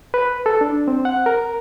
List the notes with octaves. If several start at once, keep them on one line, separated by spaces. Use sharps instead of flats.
B4
A4
D4
C4
F#5
A#4